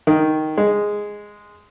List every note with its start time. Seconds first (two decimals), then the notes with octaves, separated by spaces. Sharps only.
0.07 D#3
0.58 G#3